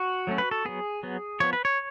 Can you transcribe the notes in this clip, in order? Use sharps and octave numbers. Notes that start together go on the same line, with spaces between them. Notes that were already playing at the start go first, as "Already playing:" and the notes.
Already playing: F#4
F#3 A3 C#4
B4
A4
F#3 B3 G#4
F#3 B3
F3 B3 C#5
B4
C#5